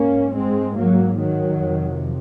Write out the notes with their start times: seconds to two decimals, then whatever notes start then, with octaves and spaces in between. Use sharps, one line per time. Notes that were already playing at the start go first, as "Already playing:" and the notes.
Already playing: G#2 A#3 C#4
0.35 G#3 C4
0.77 F#3 A#3
1.20 D#3 F#3
1.63 F2 C3